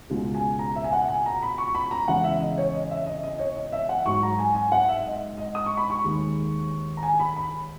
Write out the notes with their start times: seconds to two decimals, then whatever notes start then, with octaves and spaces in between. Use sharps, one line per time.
0.10 C#2 B2 G#3
0.35 G#5
0.59 A#5
0.76 E5
0.84 G#5
0.93 F#5
1.08 G#5
1.26 A#5
1.42 B5
1.58 C#6
1.75 B5
1.91 A#5
2.08 E2 C#3 G#3 F#5
2.24 E5
2.40 D#5
2.58 C#5
2.74 D#5
2.91 E5
3.07 D#5
3.23 D#5
3.39 C#5
3.56 D#5
3.72 E5
3.89 F#5
4.06 G#2 F#3 C#6
4.23 A#5
4.39 G#5
4.55 G#5
4.72 F#5
4.89 E5
5.06 D#5
5.38 D#5
5.55 D#6
5.66 C#6
5.77 B5
5.90 C#6
6.04 D#2 D#3 G#3
6.97 A#5
7.03 G#5
7.20 B5
7.36 B5